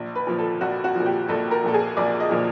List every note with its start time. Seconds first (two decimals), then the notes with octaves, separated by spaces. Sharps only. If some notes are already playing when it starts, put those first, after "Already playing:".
Already playing: A#1
0.15 B4
0.27 A#2 F3
0.39 A4
0.61 A#1 F#4
0.84 F#4
0.95 F3
1.00 A#2
1.06 G4
1.28 A#1 A4
1.51 A#4
1.63 A#2 F3 A4
1.74 G#4
1.97 A#1 D5
2.20 D#5
2.30 A#2 F3